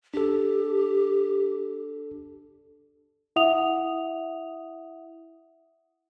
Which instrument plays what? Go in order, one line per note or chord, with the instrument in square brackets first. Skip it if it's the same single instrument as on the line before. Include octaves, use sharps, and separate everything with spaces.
[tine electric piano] D4 A4 [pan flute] G4
[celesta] E4 E5 F#5 D#6 F7